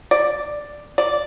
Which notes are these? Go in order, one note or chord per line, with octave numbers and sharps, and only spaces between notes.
D5
D5